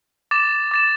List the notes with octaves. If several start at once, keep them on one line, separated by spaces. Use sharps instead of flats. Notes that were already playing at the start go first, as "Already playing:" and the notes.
D6 A6 E7
D6 A6 E7